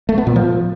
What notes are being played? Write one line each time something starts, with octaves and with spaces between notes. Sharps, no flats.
A3
B3
A#2
F3